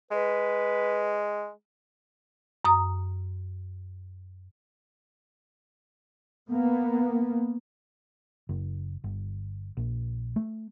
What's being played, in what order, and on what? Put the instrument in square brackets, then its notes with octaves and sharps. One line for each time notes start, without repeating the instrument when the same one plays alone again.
[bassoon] G#3 [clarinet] B4
[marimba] F#2 A#5 D#6
[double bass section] A#3 B3
[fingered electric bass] F#1
G1
A#1
A3